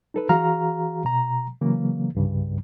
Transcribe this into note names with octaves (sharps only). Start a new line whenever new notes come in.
D#4 A4 B4
E3 F#4 G#4 F5 A#5 F6
B2 A#5
C#3 E3 F#3 A#3
C2 G2 C#3